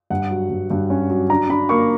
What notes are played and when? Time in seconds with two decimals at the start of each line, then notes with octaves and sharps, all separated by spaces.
0.10 G2 F#5
0.30 F#3
0.50 G2
0.70 G2
0.90 C#4
1.10 F#3
1.30 D4 A#5
1.50 D4 B5
1.69 A#3 C#6